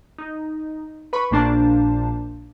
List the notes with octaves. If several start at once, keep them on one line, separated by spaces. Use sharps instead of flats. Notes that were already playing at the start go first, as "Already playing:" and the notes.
D#4
B4 B5 C#6
A#1 A#2 A#3 D4 C5 A5